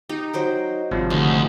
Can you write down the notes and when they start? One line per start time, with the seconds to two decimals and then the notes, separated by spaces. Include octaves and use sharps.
0.09 D#4 G4
0.33 F#3 C5 G5
0.91 G#1 C3 F3 G3
1.10 D2 D#4